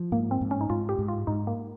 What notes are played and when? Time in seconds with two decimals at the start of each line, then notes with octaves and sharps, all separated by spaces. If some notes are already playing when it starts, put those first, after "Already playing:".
Already playing: F3
0.12 G#2 A#3
0.31 C4
0.41 G#2
0.51 C#4
0.61 D#4
0.70 G#2 F4
0.89 G4
0.99 G#2
1.08 F4
1.27 G#2 D#4
1.47 A#3